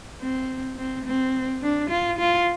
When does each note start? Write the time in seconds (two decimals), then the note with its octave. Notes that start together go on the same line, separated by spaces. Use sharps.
0.21 C4
0.78 C4
1.06 C4
1.62 D4
1.90 F4
2.19 F4